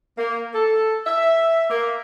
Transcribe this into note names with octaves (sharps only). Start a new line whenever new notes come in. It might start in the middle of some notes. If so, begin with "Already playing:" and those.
A#3
A4
E5
A#3